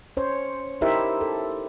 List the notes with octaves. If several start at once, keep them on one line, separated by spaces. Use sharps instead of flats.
C#4 C5 C#5
D#4 E4 G4 A#4 C5 E5
A4